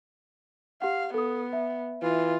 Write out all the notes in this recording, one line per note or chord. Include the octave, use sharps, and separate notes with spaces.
G4 F5 F#5
B3 A4 D#6
E5
E3 F4